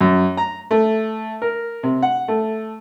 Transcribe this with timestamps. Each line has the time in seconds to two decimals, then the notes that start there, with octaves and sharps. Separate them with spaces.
0.01 F#2
0.37 A#5
0.71 A3
1.42 A#4
1.83 C3
2.02 F#5
2.28 A3